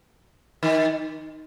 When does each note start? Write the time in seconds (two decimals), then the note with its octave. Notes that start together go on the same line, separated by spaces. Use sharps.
0.63 D#3